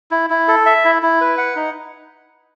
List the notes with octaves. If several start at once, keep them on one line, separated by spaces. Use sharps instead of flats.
E4
E4
A4
E5
E4
E4
B4
F#5
D#4